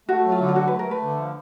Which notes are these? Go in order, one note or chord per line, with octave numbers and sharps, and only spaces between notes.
A3 F#4
F#3
F4
D3
F4
F#3 F#4
A3 B4
A#4
A3 B4
D3
F3